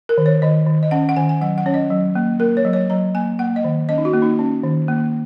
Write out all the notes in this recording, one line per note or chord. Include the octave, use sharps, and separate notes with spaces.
A#4
D#3
C#5
D#3 D#5
D#3
D#5
C#4 F#5
F#5
D#3 G#5
G#5
F#3 F#5
F#5
C#4 C#5
D#5
F#3
A#3
A#3 A#4
C#5
F#3
C#5
F#3 A#5
A#3 G#5
A#3 F#5
D#5
D#3
C#4 D#5
D#4
F#4
A#3
D#4
C#4
D#3
A#3